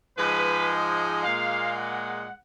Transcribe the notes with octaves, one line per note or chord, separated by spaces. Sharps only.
G#2 F3 G#3 B4
D#5
A#2 G#3 F5
F#5